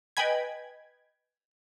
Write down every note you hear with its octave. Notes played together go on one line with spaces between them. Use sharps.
B4 D#5 G5 G#5 B5 G#6